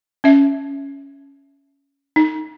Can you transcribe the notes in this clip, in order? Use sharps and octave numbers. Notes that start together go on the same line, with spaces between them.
C#4 E5
D#4